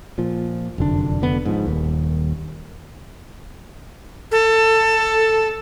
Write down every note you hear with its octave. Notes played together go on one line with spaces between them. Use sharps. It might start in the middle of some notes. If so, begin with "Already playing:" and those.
A#2 F3
F1 F#2 D3 D4
F1 D3 B3
G#2 F3
D#1 D#2
A4